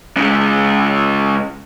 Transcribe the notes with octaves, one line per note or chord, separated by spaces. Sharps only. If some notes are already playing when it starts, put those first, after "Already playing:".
C#3 G#3